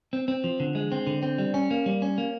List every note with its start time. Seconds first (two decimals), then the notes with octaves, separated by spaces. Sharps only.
0.13 C4
0.28 C4
0.44 F3
0.60 D3
0.75 G#3
0.92 C4
1.07 D3
1.23 C4
1.38 G3
1.54 C#4
1.71 A#3
1.86 G3
2.02 C#4
2.18 A#3